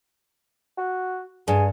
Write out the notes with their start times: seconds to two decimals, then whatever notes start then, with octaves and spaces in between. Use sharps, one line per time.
0.78 F#4
1.48 G2 G#4